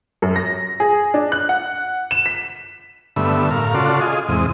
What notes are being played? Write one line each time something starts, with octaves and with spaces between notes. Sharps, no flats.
F#2
A#6
G#4
D4
F#6
F#5
E7
B6
G2 D3 A3 B3 E5
A2 A#4 F5
C#3 F4 F#4 A4 D5 C6
F4 G#4 D#5
E2 G#2 C3 D#6